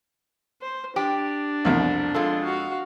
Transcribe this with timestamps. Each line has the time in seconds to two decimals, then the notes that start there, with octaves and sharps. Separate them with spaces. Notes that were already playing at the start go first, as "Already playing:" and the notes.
0.62 C5
0.96 D4 G4
1.65 C2 F2 B2
2.14 F2 G#3 F4 A4
2.44 F#4 F5